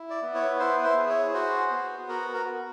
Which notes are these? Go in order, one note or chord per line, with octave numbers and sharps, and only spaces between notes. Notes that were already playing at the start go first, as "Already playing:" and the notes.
Already playing: E4
D5
B3
C#5
E4 C5
B4
C5
G#4
C#5
F#4 C5
B3
F#4 A#4
A#4
F#4